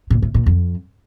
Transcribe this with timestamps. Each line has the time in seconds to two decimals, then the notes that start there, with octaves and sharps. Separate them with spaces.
0.10 A#2
0.22 A2
0.34 A#2
0.46 F2